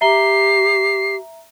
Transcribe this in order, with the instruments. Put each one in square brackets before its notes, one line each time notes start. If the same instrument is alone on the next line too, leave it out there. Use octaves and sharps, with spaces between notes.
[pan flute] G4 [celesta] E5 A#5 G7 [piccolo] C7